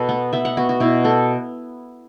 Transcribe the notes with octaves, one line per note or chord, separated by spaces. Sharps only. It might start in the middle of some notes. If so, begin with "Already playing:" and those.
Already playing: B2 A4 B4
B3
B3 E5
F#5
B3 F#4
F#4
B2 E4
B3 A4